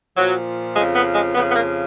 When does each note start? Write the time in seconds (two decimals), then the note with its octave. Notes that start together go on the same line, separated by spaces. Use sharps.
0.16 A#2 F3 F#3
0.76 F2 C#3 F3 G#3
0.95 B3
1.15 G#3
1.35 F2 B3
1.38 C#3 F3
1.50 B3
1.56 A#3